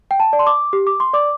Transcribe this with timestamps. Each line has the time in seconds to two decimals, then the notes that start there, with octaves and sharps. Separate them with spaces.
0.11 G5
0.20 A5
0.33 D5
0.39 C6
0.47 D6
0.73 G4
0.87 D6
1.00 C6
1.13 D5 D6